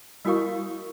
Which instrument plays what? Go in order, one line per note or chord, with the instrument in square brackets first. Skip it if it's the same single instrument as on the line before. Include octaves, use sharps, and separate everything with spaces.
[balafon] G3 E4 F#4 A#4 F5 C#6